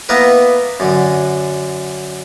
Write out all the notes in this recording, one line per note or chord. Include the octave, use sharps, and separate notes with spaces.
A#3 B3 E4 A#4 B4
F#2 D3